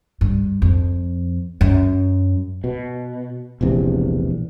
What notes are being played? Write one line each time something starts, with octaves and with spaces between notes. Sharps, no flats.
G2
F2
F#2
B2
E1 A#1 E2 C3